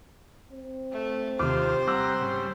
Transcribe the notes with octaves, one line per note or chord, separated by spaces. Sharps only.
C4
A3
D#2 C3 F4 C5 D6
G3 F#5 A#5 D6 E6
G#2 C#3 G3